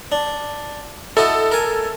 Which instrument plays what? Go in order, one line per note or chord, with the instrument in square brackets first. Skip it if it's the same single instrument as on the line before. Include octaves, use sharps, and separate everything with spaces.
[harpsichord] D4
[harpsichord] E4 F#4 D#5 [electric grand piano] A4
[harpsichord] A#4 G#5